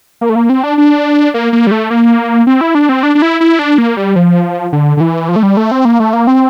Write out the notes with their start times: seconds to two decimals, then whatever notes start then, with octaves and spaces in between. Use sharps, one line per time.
0.21 A#3
0.29 A3
0.36 A#3
0.49 C4
0.63 D4
0.78 D4
1.34 A#3
1.53 A#3
1.67 G3
1.71 A3
1.90 A#3
2.47 C4
2.61 E4
2.75 D4
2.89 C4
3.03 D4
3.15 D4
3.22 E4
3.40 E4
3.59 D4
3.78 A#3
3.97 G3
4.16 F3
4.73 D3
4.97 D3
5.01 E3
5.29 F3
5.36 A3
5.43 G3
5.57 A3
5.71 C4
5.85 A#3
6.00 A3
6.13 A#3
6.27 C4